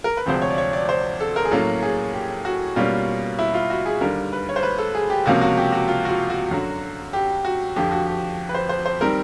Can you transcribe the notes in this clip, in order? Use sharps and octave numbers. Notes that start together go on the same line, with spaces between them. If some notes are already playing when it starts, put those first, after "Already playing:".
A#4
B4
D2 C3 F3 G#3 C4 C5
C#5
D5
C#5
D5
C5
A4
A#4
G#4
A2 F#3 A#3 C#4 A4
G#4
G4
F#4
B2 G3 A#3 C#4 F4
E4
F4
F#4
G#4
D#2 D3 G3 A#4
B4
C#5
C5
B4
A4
G#4
G4
C#2 C3 F3 A#3 C#4 F#4
F#4
G4
F#4
F4
F#4
F4
F#4
F#2 D3 F#3
G4
F#4
F2 D3 F3 G4
F#4
G4
B4
C5
C5
C5
D#3 G3 C4 A#4